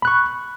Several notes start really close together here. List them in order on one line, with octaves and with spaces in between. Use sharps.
B5 F#6 C#6